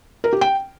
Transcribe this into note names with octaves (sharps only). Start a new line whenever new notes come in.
A#4
G4
G5